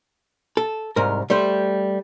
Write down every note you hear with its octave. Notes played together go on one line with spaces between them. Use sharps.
A4
C2 G#2 A#4
G3 A3 C5